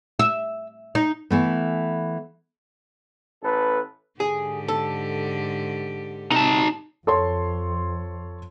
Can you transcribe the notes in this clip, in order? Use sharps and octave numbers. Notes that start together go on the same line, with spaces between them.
E5
D#4
E3 A3 B3
A1 A4 B4
G#2 D3 G4 G#4
A4
C3 D#4 A5
F2 A4 C#5 C6